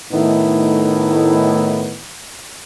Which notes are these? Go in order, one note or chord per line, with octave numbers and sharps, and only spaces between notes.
A2 D#3 A3 B3 D#4 E4